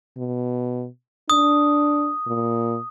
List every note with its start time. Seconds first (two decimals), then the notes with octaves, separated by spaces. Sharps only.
0.18 B2
1.30 D4 D#6
2.27 A#2